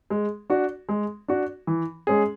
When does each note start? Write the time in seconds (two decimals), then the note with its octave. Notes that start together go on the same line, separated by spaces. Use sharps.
0.10 G#3
0.50 D4 F#4
0.89 G#3
1.28 D4 F#4
1.67 E3
2.07 G#3 C#4 G#4